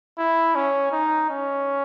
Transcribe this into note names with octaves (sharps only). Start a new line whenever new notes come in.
E4
C#4
D#4
C#4